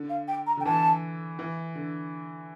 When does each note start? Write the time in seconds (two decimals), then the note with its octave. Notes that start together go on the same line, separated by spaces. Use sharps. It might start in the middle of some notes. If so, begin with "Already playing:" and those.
Already playing: D3
0.10 F5
0.28 G5
0.47 A#5
0.57 D3
0.60 G5
0.65 E3 A5
1.39 E3
1.75 D3